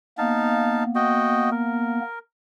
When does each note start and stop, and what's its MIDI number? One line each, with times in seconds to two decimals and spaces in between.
0.18 2.00 58
0.18 2.00 59
0.18 0.84 63
0.18 0.84 77
0.18 0.84 81
0.95 1.50 66
0.95 1.50 75
0.95 1.50 79
1.52 2.19 70